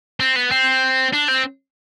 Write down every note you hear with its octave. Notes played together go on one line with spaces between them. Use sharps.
C4
B3
C4
D4
C4